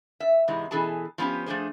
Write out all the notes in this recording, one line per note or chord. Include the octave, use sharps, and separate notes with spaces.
E5
G#2 C3 E3 G#3
B2 E3 C#4 G#4 A4 A5
F3 B3 C#4 F4 G4
F3 A3 D4 G#4 C5